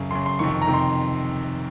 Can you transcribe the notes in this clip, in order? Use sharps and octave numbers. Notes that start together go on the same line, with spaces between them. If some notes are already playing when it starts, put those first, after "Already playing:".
Already playing: F#2 C#3
F#2 C#3 C6
C6
F2 C3 D#3 C#6
A#5
C3 D#3
C6